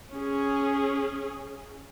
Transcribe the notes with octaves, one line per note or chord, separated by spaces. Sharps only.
C#4 G#4